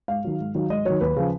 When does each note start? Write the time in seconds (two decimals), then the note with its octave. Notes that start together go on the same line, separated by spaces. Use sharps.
0.08 G#2 F5
0.24 D#3 F#3
0.40 G#2
0.55 D#3 F#3
0.70 G#2 D#5
0.85 D#3 F#3 C#5
1.01 D#2 B4
1.16 C#3 F3